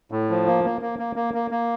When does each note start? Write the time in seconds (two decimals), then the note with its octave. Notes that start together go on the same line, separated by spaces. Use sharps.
0.12 A2
0.30 F3
0.47 A#3
0.64 A#3
0.82 A#3
0.99 A#3
1.16 A#3
1.34 A#3
1.51 A#3